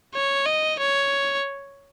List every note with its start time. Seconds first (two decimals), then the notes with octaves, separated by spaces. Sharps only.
0.14 C#5
0.46 D#5
0.79 C#5